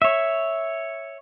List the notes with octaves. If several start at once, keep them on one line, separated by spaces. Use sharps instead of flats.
C#5 E5